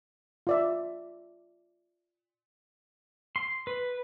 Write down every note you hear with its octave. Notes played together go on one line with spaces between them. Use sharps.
F4 D5 E5
C6
B4